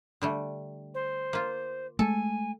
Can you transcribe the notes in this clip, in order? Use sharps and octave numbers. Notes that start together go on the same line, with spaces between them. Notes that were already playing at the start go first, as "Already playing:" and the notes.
D3 G3 A3
C5
A#3 F4
G#3 A3 A4 G#5